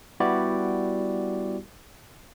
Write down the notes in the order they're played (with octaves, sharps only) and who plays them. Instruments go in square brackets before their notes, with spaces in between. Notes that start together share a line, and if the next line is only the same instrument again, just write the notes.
[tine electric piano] G3 B3 E4 F#4 G4 D5